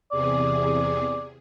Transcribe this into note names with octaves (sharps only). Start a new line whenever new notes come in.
E2 C3 G#4 D5